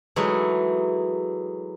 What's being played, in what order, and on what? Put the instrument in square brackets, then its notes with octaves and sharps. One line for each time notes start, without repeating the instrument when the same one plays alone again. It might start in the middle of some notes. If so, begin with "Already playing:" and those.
[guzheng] E3 F#3 G#3 A3 D#4